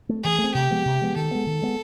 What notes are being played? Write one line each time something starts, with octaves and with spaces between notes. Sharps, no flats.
A3 C4
E3 G#4
A3
C4
C3 G4
F3 G#3 B3
C3
F3 G#3 B3
D#3 A4
G#3 B3
D#3
G#3 B3